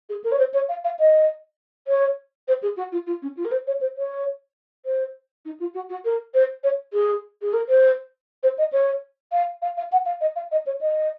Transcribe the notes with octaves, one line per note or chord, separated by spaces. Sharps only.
G#4
A#4
C#5
C5
C#5
F5
F5
D#5
C#5
C5
G#4
F#4
F4
F4
C#4
F4
A#4
C5
C#5
C5
C#5
C5
D#4
F4
F#4
F#4
A#4
C5
C#5
G#4
G#4
A#4
C5
C5
D#5
C#5
F5
F5
F5
F#5
F5
D#5
F5
D#5
C#5
D#5